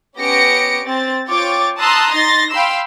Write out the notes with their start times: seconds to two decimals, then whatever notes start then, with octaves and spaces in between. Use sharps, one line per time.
0.19 B3 C#4 G4 A#6 C#7 D7
0.85 C4 A6
1.29 F4 C#5 G5 C#6 D6 A6
1.80 A5 A#5 C6 D#6 E6 F#6
2.12 D#4 C6 A6 A#6
2.52 F5 G5 B5 C6 E6